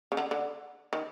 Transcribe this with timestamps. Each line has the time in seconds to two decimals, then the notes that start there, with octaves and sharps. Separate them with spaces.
0.12 C#3
0.17 D3
0.31 D3
0.93 D#3